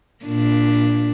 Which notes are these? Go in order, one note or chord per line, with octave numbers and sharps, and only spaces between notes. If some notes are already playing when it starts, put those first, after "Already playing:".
A#2 D4